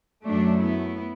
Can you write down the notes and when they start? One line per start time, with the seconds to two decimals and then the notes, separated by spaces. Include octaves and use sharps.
0.25 F#2 F#3 A3 D4
0.62 B3 E4